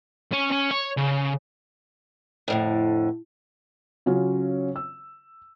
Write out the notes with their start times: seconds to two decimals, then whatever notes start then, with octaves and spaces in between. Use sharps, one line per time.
0.33 C#4
0.52 C#4
0.71 C#5
0.97 C#3
2.48 F2 A2 D3
4.06 C#3 F#3 C#4 F4
4.76 E6